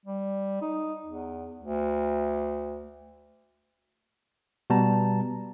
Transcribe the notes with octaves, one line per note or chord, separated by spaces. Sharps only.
G3
D#4
E2
D2
B2 G3 B3 A5 A#5